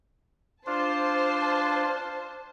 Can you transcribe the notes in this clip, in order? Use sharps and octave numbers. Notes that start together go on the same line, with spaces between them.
D4 F4 C5 A5